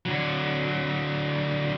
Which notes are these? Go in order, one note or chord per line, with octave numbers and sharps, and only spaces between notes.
D3 F#3